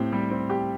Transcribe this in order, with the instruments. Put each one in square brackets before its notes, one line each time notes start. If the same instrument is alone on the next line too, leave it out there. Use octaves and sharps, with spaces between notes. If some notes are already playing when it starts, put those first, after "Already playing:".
Already playing: [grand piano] A2 C4 G4
G3
C4
G4